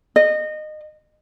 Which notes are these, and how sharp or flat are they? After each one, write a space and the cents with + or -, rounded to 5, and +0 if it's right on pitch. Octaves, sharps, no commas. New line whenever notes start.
D#5 -25